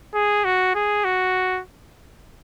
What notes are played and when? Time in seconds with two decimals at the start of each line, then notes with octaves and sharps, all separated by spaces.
0.14 G#4
0.45 F#4
0.75 G#4
1.04 F#4